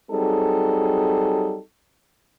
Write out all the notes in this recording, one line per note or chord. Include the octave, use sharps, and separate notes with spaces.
F#3 G3 C4 D#4 G#4 A4